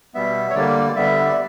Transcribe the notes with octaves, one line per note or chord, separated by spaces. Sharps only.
B2 G3 B3 E5
C#5
D3 G3 A#3 D5
D3 G3 B3 E5
D5